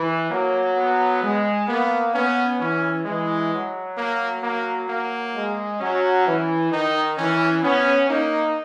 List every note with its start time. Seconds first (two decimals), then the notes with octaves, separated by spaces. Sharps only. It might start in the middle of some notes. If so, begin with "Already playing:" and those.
Already playing: E3
0.30 F#3 A#3
0.77 B3
1.22 G#3
1.68 A#3 B3
2.14 B3 C#4
2.60 E3 C#4
3.05 E3 G#3
3.51 F#3
3.97 A#3
4.43 A#3
4.89 A#3
5.35 G#3
5.80 F#3 C#4
6.26 E3
6.72 D#3 D#4
7.17 E3 C#4
7.63 B3 C#4
8.09 A#3 D#4